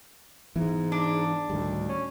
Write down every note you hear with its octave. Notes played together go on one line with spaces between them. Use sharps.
G#2 E3 B3
D4
D2 A2 D#3 G3
C#4